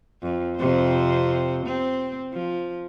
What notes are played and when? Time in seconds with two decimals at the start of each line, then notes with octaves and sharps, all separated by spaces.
0.23 F2
0.57 F2 C3 C5
1.65 C4
2.33 F3